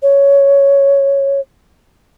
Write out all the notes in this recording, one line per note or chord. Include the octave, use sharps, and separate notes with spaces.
C#5